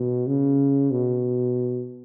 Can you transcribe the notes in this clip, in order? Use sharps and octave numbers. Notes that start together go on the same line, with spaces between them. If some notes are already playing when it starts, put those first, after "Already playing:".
Already playing: B2
C#3
B2